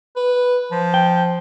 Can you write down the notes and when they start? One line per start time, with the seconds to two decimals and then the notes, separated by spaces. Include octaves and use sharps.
0.16 B4
0.72 F3
0.94 G5